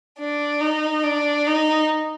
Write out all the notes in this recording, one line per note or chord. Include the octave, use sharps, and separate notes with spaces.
D4
D#4
D4
D#4